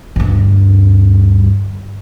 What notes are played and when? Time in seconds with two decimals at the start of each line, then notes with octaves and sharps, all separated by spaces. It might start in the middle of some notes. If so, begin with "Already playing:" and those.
0.16 D2 G2